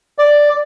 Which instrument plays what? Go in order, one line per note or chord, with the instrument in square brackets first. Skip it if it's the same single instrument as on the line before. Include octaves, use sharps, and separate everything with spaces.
[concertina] D5